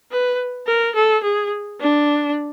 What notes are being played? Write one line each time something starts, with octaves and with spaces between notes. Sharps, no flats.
B4
A#4
A4
G#4
D4